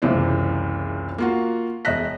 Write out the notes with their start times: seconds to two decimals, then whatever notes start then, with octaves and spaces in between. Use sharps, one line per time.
0.02 F#1 C#2 C3 E3 C5 D5
1.18 A#3 F4 F#4
1.85 E1 D#5 E5 F#6 A#6 B6